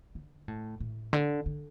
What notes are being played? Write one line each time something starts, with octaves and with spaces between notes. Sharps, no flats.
D3
A2
A2
D3
D3